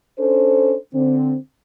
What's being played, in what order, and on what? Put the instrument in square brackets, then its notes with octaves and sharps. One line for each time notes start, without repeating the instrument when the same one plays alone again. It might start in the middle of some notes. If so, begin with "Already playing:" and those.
[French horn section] C#4 D4 A4 C5
D3 C4